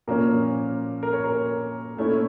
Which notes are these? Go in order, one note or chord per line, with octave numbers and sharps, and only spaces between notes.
A#2 F3 A#3 C#4 A#4
A#4
C#5
A#4
A#2 A3 C#4 E4